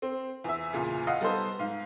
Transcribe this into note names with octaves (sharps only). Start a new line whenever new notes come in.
C4
E2 E5
E2 A#2 C#3
D#5 F5 F#5 D#6
G3 B3 D#4 A4 C5
G#2 F5